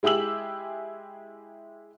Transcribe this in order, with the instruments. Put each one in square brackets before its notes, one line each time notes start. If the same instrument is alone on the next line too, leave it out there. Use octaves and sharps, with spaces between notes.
[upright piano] G#3 E4 G4 G#4 E6 F#7